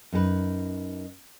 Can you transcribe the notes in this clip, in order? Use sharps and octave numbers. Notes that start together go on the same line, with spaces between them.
F#2 D#4 A4 B4